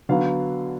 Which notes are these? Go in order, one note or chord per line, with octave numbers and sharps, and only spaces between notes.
D3 F#3 B3 F5